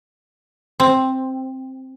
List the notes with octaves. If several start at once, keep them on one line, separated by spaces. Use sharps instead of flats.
C4